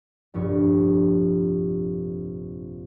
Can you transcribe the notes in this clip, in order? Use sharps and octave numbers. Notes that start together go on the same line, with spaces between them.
F1 A#1 G2 C#6